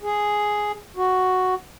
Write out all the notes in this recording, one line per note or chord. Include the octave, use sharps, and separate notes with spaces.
G#4
F#4